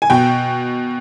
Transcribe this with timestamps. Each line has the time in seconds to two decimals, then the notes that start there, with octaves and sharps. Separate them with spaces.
0.02 G#5
0.10 B2 G5